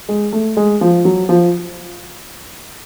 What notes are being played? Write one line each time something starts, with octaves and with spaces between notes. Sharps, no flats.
G#3
A3
G#3
F3
F#3
F3